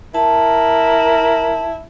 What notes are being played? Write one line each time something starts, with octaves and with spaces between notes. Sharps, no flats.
E4 A#4 A5